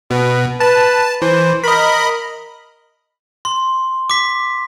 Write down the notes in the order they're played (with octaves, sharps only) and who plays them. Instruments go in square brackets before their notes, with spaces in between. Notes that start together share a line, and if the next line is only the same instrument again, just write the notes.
[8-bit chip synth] B2 [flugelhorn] B4
[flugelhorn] B4 [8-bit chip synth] A5
[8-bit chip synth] E3 [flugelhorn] C5
[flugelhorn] A#4 [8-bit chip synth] D#5 B5
[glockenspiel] C6
D6 B6